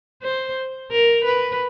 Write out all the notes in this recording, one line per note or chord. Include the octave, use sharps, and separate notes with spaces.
C5
A#4
B4